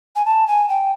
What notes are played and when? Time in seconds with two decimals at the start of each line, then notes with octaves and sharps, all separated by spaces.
0.15 G#5
0.25 A5
0.47 G#5
0.68 G5